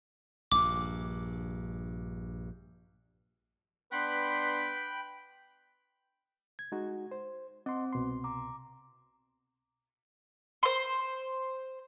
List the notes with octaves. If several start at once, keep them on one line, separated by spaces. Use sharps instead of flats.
A#1 G2 D6
B3 D4 B4 G5 B5 C6
G#6
G#3 D#4 F#4
C5
C4 D#5 C6
C2 B2 C6
A#5 D6
C5 C6